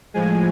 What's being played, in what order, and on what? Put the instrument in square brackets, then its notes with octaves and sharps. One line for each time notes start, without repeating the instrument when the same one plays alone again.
[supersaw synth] A2 F3 G#3 G#5